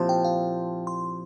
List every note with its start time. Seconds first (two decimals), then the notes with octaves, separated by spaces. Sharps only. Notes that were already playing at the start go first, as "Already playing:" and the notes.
Already playing: A#2 F3 C4 E4 G4 A5 C6
0.09 G5
0.24 F5
0.87 C6